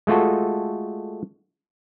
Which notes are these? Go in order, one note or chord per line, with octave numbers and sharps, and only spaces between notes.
G#3 A3 F4 F#4 A4